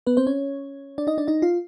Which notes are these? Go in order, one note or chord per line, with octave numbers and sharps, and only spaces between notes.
B3 B4
C4 C5
C#4 C#5
D4 D5
D#4 D#5
D4 D5
D#4 D#5
F4 F5